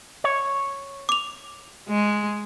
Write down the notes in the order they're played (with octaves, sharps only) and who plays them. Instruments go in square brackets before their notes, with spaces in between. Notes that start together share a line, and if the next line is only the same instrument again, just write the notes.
[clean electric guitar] C#5
[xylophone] D6 F7
[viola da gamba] G#3